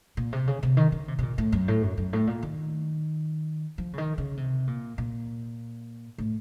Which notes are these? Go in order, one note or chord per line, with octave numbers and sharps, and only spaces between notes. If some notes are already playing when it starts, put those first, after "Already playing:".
A#2
C3
C#3
C3
D#3
D#3
C3
C3
A#2
A2
F#2
A2
F#2
F#2
A2
A#2
D#3
F3
C#3
D#3
C#3
C3
A#2
A#2
A2